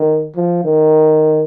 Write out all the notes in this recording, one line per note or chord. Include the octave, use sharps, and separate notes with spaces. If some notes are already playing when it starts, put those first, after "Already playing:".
Already playing: D#3
F3
D#3